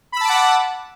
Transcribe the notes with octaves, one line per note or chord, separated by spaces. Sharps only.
F#5 A5 B5 D6 E6